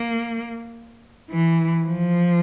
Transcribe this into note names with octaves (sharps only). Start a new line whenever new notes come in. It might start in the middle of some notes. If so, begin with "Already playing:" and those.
Already playing: A#3
E3
F3